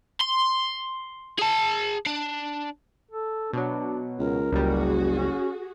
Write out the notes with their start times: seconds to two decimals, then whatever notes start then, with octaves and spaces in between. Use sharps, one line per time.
0.21 C6
1.39 G#4 A5
2.06 D4
3.11 A4
3.53 B2 F#3 D4
4.19 C#2 A#4
4.52 F#1 C#2 G3 F#4 G#4
5.17 C#4